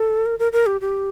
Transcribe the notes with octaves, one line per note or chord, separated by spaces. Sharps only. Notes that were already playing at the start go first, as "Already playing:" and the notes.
Already playing: A4
A#4
A#4
A#4
G4
G4